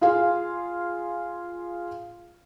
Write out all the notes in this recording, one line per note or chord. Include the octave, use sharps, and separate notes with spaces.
F4 G#4 F5